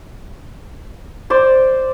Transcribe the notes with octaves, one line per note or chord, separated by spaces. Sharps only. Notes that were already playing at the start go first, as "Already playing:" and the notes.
C5 D5